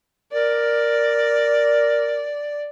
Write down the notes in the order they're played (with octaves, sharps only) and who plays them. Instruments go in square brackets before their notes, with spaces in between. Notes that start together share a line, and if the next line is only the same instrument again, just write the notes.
[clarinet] A#4 [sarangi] D5